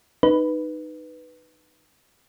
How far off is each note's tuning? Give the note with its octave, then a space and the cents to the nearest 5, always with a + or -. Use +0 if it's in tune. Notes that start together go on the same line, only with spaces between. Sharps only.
D#4 -15 B4 +0